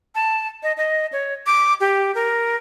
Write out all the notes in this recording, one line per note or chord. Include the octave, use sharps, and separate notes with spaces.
A5
D#5
D#5
C#5
D6
G4
A#4